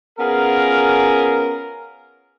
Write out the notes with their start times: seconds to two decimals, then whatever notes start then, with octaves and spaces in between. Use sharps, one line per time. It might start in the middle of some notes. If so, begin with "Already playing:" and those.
0.19 B3 C#4 F4 G#4 A#4